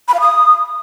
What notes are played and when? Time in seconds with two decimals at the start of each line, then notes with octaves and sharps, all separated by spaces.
0.08 B5
0.14 F5
0.20 D#6